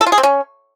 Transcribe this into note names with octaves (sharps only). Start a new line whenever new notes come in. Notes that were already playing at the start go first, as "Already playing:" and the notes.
A4
F4
G#4
C4
C#4